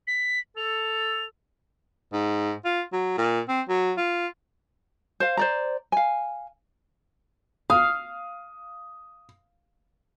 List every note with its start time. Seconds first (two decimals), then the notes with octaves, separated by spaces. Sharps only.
0.07 B6
0.57 A4 F7
2.13 G#2
2.65 F4
2.93 F#3
3.18 A#2
3.49 C4
3.69 F#3
3.98 F4
5.20 C5 F5
5.37 C5 D5 A#5
5.92 F5 G#5
7.70 F5 D#6